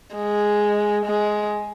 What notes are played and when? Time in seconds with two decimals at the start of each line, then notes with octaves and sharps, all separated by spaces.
0.15 G#3
1.06 G#3